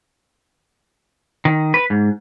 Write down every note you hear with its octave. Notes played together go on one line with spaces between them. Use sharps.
D#3
B4
G#2